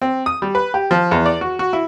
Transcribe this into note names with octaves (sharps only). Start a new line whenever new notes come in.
C4
D#6
G3
B4
G4
F3
E2
D5
F#4
F#4
E4